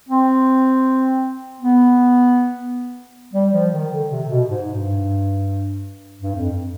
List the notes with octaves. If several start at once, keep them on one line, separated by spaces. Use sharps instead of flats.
C4
B3
G3
F3
D#3
D3
C3
B2
G#2
G2
G2
F2